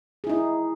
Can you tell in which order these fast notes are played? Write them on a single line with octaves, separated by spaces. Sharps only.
G#4 E4 D#4